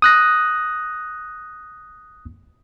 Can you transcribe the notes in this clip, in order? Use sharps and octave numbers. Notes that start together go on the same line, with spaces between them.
D#6 F#6 A#6